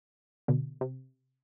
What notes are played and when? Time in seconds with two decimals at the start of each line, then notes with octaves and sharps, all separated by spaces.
0.48 B2 D3
0.81 C3